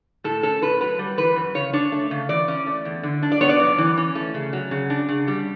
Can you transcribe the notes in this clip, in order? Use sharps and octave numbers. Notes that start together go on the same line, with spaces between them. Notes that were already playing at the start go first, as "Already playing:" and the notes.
A2 A4
C#4 A4
A2 B4
F#3 B4
G3
E3 B4
F#2
C#3 C#5
D4 C#5
A3
C#3
E3 D5
C#4
A3
E2
D3
D4
D5
B3 C#5
D5
F#2
E3
C#4
A3
C#3
F#3
C#3
D4
C#3
G3